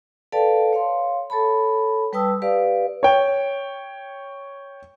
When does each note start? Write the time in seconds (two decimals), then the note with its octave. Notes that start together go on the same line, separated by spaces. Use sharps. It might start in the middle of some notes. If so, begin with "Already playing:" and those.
0.32 A4 B4 D5 F5 G5 A5
0.73 C#5 F5 C6
1.30 A4 C#5 A5 B5
2.13 G3 B4 G5 A5 D#6 E6
2.42 G4 B4 D5 F5
3.03 C#5 G5